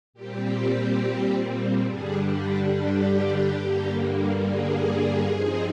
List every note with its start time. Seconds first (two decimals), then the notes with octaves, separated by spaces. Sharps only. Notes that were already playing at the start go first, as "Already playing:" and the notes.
0.13 A#2 G3 C4 G4
1.86 G2 D3 G3 D4 G#4
2.28 G4
2.72 G4
3.57 G2 D3 G3 A#3
4.43 G#4
5.29 G2 F3 C4 D#4